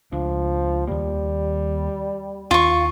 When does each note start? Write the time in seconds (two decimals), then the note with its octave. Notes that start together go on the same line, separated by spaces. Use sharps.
0.12 C#2 F3 D4
0.87 D#2 G3 A#3
2.51 D#2 F4 C#6